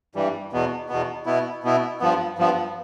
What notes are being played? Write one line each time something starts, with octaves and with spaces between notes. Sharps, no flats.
G2 E3 G3
E2 B2 B3
E2 B2 B3
B2 B3 E4
B2 B3 E4
G2 F3 B3
G2 F3 B3